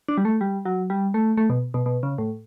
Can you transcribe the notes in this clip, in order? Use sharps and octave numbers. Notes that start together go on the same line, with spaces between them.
D4
G3
A3
G3
F#3
G3
A3
A3
B2
B2
B2
C#3
A2